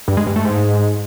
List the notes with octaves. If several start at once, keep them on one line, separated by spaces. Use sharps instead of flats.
G2
G#3
G2
A3
G#2